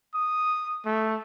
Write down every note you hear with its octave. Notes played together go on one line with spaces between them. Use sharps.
D#6
A3